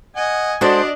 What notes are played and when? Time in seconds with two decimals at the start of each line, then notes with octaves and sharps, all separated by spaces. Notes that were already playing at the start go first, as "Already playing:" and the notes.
0.16 D#5 F#5 G#5
0.61 G#3 D4 F#4 A4 C5 D5 D#5